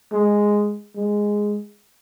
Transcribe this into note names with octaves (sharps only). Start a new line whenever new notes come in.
G#3
G#3